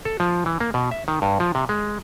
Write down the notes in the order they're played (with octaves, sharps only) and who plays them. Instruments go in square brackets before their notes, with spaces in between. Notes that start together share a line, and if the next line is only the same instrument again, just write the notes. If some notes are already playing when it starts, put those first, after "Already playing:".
[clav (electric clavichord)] A4
F3
E3
A#3
B2
E5
D#3
G2
F3
C3
G#3